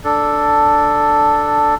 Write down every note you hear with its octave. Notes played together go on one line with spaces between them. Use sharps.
D4 A4